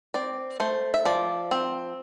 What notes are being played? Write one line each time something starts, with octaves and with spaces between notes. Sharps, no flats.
C4 D5
A3 C5
E5
F3 D5
C4